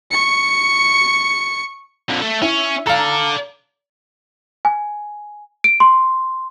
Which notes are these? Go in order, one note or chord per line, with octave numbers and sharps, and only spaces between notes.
C#6 C#7
F2 D3
A3 A4
C#4 E4
A4 D5 F5 A#5
G#5
D7
C6